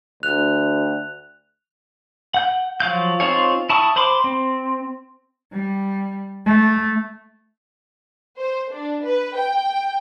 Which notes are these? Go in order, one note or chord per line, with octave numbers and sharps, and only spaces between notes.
D2 F#6 F7
F#5 G6
F3 F#3 F5 G6
C4 D#4 F4 G#4 C#5
E4 A5 C#6 D#6
C5 B5 C6 D6
C4
G3
A3
C5
D4
B4
G5